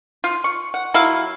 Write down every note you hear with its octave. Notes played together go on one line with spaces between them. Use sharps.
F4
C#6
F#5
F#3 E4 F4 F5